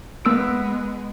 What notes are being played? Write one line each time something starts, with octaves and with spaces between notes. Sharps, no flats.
G#3 A#3 B3 E6 D7